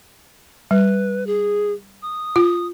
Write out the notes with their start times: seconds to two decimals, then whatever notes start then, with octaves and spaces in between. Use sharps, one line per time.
0.71 G3 B4
1.27 G#4
2.02 D#6
2.36 F4